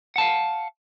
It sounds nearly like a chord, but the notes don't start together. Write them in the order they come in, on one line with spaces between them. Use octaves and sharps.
F#5 A5 F5